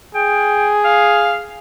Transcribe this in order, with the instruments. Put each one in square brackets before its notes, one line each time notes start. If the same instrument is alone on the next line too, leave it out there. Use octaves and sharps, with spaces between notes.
[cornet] G#4 [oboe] G5
[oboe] F5